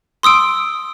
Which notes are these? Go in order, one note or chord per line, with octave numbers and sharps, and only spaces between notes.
C6 D#6 E6 D7